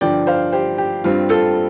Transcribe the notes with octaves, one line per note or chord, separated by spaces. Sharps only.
G2 D3 F3 D5 G5
C5 F5
G4 C5
G4
G2 G3 C4 F4
F4 A4